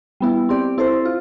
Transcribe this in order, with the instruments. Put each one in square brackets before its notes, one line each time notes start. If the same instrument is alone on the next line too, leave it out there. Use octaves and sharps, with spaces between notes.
[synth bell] G3 B3 E4
C4 G4 D5
C4 E4 A4 C5
F4